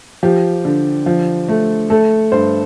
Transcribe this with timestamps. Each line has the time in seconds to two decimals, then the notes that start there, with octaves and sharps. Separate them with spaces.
0.23 F3 G4
0.65 D3
1.06 F3
1.48 A3
1.90 A3 A4
2.32 G2 C5